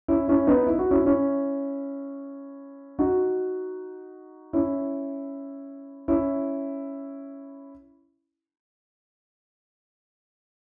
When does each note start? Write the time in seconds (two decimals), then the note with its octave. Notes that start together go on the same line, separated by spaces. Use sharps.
0.08 C#4 E4
0.28 C#4 E4
0.47 B3 D#4
0.67 E4
0.79 F#4
0.91 C#4 E4
1.05 C#4 E4
2.99 D#4 F#4
4.53 C#4 E4
6.08 C#4 E4